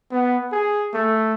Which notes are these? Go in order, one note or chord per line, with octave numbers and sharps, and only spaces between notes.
B3
G#4
A3